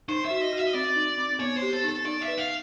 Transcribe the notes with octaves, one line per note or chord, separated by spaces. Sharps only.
D#4 C5
E5
F#4
D#5
F#4
E5
D#5
C4 D5
D#4
C4
B3 C#5
C5
G4
A4
D#4 A4
D#4 D5
E5
B4
F5